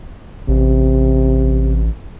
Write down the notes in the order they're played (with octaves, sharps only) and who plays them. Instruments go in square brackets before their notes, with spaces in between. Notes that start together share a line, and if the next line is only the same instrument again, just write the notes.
[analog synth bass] A1 [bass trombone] C3